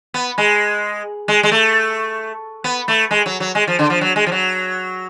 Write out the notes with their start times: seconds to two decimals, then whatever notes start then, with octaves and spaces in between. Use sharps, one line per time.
0.14 B3
0.38 G#3
1.28 G#3
1.43 G#3
1.51 A3
2.64 B3
2.88 A3
3.11 G#3
3.26 F#3
3.40 F#3
3.55 G#3
3.68 F3
3.79 D3
3.90 F3
4.01 F#3
4.16 G#3
4.27 F3
4.32 F#3